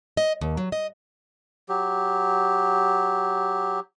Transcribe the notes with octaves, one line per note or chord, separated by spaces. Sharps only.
D#5
D#2
F#3
D#5
F#3 G4